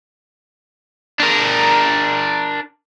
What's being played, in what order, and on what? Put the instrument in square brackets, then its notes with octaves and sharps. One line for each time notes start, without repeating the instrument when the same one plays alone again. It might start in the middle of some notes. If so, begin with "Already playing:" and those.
[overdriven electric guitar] D4 A#4